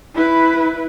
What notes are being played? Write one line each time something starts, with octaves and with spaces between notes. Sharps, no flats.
E4 B4